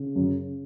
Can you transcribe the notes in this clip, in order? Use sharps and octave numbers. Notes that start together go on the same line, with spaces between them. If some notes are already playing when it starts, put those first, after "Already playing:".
Already playing: C#3
F#2